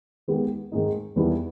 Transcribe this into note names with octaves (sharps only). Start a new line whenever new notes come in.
D#3 G#3 B3 G4
G#2 D#3 G#3 D#4
E2 D#3 G3 B3 E4